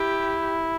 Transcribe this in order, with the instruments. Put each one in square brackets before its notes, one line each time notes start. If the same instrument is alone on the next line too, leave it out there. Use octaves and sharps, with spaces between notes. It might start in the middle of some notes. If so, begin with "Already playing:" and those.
Already playing: [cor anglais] E4 [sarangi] G4